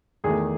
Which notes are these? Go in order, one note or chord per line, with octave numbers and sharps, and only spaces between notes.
E2 D#3 A3 G#4